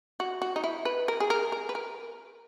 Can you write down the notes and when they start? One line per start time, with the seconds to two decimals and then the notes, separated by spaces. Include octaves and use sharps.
0.20 F#4
0.42 F#4
0.56 D#4
0.64 E4
0.85 B4
1.08 A#4
1.20 G#4
1.30 A#4
1.52 A#4
1.69 B4
1.75 A#4